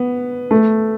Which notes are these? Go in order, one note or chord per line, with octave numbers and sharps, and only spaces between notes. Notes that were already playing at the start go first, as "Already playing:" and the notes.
Already playing: B3
A3